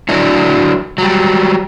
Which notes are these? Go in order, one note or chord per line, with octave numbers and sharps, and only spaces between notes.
F#3 D4 E4
F#3 G3